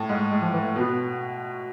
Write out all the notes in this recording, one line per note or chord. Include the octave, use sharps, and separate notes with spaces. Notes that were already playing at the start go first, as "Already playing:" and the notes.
Already playing: A2
G#2 G#3
G#3
F3
E3
A3
B2 B3